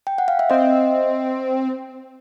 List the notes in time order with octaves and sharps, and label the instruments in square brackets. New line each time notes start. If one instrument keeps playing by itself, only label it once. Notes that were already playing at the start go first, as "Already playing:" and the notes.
[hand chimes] G5
F#5
F5
E5
[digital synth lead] C4 [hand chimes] D#5